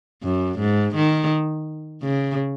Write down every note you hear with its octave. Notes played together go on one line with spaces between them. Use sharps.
F#2
G#2
D#3
C#3